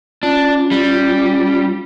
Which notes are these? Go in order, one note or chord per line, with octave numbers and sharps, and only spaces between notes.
C#4 D4 F4
G3